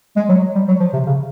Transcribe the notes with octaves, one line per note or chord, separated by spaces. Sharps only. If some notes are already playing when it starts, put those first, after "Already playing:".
G#3
F#3
G3
F#3
F3
C3
C#3